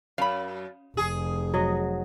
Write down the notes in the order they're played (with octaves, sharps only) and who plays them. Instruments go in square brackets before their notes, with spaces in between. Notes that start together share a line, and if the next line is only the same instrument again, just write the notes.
[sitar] F#2 [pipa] F5 B5
[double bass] F1 [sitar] G#4
[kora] F#3 D#5